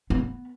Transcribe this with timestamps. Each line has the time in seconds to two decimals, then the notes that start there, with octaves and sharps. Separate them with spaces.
0.10 B3